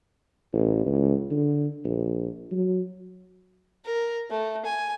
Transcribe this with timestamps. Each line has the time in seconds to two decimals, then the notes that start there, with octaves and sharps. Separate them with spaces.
0.53 A1
0.86 C#2
1.31 D3
1.85 A#1
2.52 F#3
3.85 A#4
4.30 A3
4.65 G#5